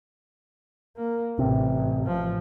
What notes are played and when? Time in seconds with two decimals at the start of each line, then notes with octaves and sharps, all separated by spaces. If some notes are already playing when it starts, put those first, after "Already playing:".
0.97 A#3
1.39 A1 C3
2.07 A1 F3